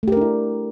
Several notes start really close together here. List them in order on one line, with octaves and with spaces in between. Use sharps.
A3 G4 A#4 D4 E4